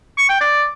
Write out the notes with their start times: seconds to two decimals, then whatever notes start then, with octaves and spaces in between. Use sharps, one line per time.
0.18 C#6
0.29 G5
0.41 D5